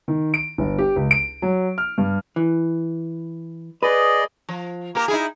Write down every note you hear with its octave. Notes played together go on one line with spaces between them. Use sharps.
D#3
D7
G1
G4
C#2
D7
F#3
F6
G2
E3
G#4 B4 D5 D#5
F3
A#3 G4 A#4
D#4 E4 G#4